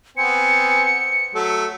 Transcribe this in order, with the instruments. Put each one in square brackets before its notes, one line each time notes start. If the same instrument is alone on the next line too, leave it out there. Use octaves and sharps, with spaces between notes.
[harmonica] B3 C4 G#5 [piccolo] C#7
[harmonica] F#3 A3